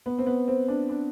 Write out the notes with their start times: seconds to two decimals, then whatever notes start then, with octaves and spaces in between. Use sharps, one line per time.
0.06 B3
0.18 C4
0.27 B3
0.48 C4
0.68 D4
0.89 D4